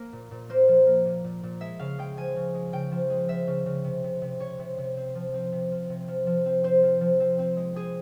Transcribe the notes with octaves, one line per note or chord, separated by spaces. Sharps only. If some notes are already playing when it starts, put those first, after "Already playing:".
Already playing: A#3
A#2
A#2
A#3 C5
F3
A#3
A#2
A#2
A#2
G#3 E5
C#3 F5
G#3 G5
F3 G#5
C#3
G#3
C#3 G5
F3
G#3
F3 E5
C#3
C#3
C3
C3
C3
C3 C#5
C3
C3
C4
F3
C4
C3
F3
C3
F3
F3
C4
C4 C5
F3
F3
C4
C4
G#3
C4 G#4